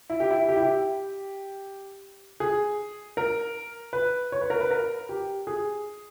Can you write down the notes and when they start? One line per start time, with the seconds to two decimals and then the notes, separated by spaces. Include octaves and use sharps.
0.10 E4
0.20 G4
0.31 E4
0.49 G4
0.56 E4
0.62 G4
2.40 G#4
3.17 A#4
3.93 B4
4.32 C#5
4.41 B4
4.50 A#4
4.60 B4
4.71 A#4
5.09 G4
5.47 G#4